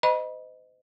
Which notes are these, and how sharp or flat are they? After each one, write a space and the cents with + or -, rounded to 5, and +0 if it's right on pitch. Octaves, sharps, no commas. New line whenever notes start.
C5 -40 D#5 +0 B5 -30